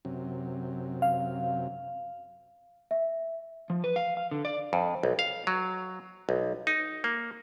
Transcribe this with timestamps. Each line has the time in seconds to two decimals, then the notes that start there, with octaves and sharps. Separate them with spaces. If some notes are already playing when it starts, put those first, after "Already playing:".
0.05 F#2 C3
1.02 F5
2.91 E5
3.70 F3
3.84 B4
3.96 F5
4.17 F5
4.31 D3
4.45 D5
4.73 F2
5.03 B1
5.19 F5
5.47 F#3
6.29 B1
6.67 D#4
7.04 A#3